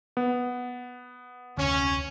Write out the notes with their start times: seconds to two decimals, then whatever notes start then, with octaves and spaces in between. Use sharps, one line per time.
0.17 B3
1.57 F1 D2 C#4